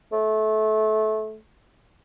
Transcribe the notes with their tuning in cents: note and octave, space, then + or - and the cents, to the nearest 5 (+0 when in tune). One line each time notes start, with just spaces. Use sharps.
A3 -25